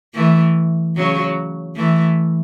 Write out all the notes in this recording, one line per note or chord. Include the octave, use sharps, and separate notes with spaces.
E3 A3
C#3 F#3
E3 A3